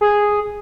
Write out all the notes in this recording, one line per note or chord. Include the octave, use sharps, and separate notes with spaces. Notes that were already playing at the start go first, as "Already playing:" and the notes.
G#4